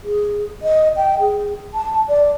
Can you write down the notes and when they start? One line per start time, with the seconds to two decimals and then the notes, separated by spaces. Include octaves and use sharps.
0.04 G#4
0.62 D#5
0.97 G5
1.20 G#4
1.74 A5
2.08 D5